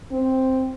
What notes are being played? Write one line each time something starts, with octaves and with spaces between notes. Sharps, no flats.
C4